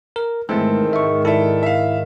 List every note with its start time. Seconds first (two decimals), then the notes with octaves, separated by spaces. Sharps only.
0.16 A#4
0.49 G#2 D#3 E3 G#3 A3 C4 A4
0.93 E5 C#6
1.25 E4 A4 D5 E5
1.63 E5 F5